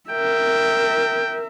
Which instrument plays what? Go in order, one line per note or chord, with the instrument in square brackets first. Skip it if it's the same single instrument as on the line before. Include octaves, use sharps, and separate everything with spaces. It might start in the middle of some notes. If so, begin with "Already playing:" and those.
[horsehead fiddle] A#4 E5 [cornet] G5